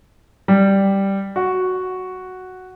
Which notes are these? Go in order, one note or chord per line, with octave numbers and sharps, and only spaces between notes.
G3
F#4